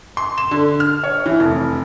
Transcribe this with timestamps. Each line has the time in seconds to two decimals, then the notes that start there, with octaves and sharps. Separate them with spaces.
0.17 C6
0.38 E7
0.51 D3
0.80 F6
1.04 C#5
1.26 E3
1.40 F1